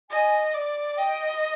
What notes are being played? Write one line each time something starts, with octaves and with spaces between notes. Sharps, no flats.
D#5 G#5
D5
D#5 G5